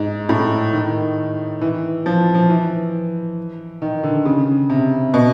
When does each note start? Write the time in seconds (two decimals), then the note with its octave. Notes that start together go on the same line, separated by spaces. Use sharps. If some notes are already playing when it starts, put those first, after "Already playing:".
Already playing: G#2
0.29 A2
0.73 D#3
1.61 E3
2.06 F3
2.34 F3
2.50 E3
3.82 D#3
4.03 D3
4.25 C#3
4.70 C3
5.14 B2